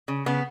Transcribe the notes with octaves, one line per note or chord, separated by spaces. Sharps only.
C#3
C#3 B3